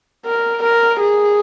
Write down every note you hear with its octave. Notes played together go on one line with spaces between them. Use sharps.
A#4
A#4
G#4